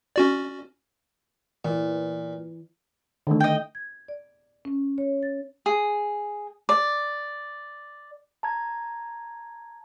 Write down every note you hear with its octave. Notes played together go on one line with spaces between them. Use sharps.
C#4 F#4 D5
A#2 E3
D3 D#3 A3
D#5 G5
G#6
D5
C#4
C#5
A6
G#4
D5
A5 A#5 G#6